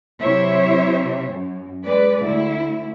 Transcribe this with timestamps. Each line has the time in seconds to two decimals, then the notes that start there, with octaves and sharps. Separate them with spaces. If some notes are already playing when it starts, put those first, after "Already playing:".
0.21 C3 F#3 E4 C5 C#5 E5
1.33 F#2
1.85 G#3 B4 D5
2.22 D2 E4